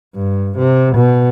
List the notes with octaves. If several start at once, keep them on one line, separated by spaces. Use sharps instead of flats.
G2
C3
B2